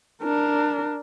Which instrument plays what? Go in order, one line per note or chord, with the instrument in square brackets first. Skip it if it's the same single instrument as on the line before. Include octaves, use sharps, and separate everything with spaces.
[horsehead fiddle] D4 A#4